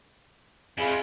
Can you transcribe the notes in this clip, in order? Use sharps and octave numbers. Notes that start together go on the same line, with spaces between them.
F2 G#3 E4 F4